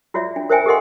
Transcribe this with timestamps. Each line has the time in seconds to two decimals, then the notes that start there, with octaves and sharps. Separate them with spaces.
0.14 F4 F#4 C#5 D5 E5
0.36 D4
0.50 A#4 C5 C#5 E5 G5 G#5
0.66 G4 A4 A#4 D#5 F#5 C6